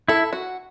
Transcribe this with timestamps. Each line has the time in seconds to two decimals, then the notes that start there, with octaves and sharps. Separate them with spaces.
0.08 E4 A4
0.33 F#4